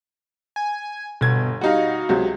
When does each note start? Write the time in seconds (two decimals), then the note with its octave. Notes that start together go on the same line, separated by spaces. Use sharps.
0.56 G#5
1.21 G1 B2 G#6
1.61 G3 D#4 F#4 F5
2.09 C#2 C3 F#3